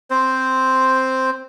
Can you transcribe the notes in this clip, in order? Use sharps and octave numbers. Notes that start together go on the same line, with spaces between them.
C4 C5